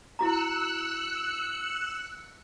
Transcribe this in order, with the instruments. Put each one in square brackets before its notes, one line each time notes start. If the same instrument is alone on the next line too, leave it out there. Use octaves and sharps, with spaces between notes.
[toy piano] E4 F#4 A#5 [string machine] E6 F#6 C#7